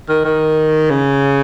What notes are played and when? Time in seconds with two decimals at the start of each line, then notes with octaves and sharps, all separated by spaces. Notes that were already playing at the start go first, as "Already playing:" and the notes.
0.09 D#3
0.25 D#3
0.90 C#3